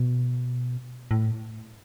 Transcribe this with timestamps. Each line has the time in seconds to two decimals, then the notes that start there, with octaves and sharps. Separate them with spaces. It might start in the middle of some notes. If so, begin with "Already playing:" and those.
Already playing: B2
1.11 A2